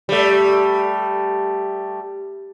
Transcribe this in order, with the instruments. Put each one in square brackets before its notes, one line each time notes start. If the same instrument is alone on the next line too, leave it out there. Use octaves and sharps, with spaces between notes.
[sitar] G3 A3